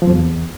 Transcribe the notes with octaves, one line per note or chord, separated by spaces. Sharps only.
F3
F2
E2